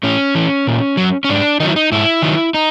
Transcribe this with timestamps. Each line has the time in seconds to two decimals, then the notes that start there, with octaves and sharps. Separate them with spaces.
0.03 A2 C#4
0.35 E3
0.67 A#2
0.97 F#3
1.24 C#4
1.29 G#2 D4
1.60 D#3 F#3 D#4
1.69 E4
1.76 D#4
1.92 G#2 E4
2.22 D#3 F#3
2.54 D#4